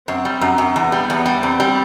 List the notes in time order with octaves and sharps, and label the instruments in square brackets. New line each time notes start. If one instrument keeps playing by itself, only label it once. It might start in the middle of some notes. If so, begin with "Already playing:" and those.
[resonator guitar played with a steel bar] F#2 [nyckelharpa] C4
[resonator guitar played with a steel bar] G3
F#2
F#2
[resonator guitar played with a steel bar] E2 [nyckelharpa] B3
[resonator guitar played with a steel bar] G3
[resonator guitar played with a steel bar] E2 [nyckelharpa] B3
[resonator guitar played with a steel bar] G3
[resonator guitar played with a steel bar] E2 [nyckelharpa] C4
[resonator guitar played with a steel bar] G3